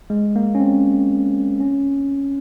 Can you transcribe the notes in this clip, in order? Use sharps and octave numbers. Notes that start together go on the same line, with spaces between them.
G#3
A#3
C#4
C4
C#4